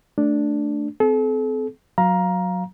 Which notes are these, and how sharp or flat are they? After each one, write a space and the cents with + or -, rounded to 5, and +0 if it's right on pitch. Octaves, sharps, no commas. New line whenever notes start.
A3 +0 D4 +0
C4 -30 A4 -40
F#3 -10 F5 +0 A#5 +15